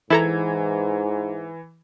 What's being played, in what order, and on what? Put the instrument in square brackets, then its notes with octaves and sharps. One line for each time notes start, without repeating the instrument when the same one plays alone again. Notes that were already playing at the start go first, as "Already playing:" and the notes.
[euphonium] G#2 [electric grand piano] E3 G#6 [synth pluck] E4 A4 A#5